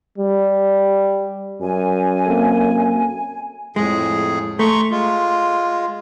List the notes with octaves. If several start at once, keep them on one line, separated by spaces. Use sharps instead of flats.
G3
F#2 G#5
A#3 C4 A4
F2 A2 G#3 G#4
A3 A#5 C6 C#6
G#3 F4